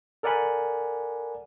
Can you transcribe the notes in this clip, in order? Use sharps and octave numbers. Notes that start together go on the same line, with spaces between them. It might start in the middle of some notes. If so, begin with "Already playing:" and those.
A4 A#4 D5 F#5 G#5 B5